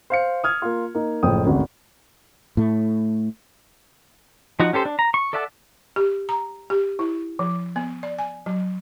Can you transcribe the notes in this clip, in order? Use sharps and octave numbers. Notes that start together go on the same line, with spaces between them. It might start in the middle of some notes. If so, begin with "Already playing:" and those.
C5 F5 C#7
D#6 F6 G#6
A#3 F4
A#3 D#4
F#1 A2 F3 G5 D#6
G#1 D2 C#3 F#4
A2 A3
F3 D#4 F#4 F#5
C#4 G4 A4 C5
D4
A#5
C#6
A4 D5 E5 F#5 A5
G4
A#5
G4
E4
F3
B3
D5
G#5
F#3